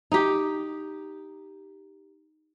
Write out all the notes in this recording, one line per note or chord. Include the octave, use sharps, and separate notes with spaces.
D#4 G4